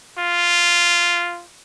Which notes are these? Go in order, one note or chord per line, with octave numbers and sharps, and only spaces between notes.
F4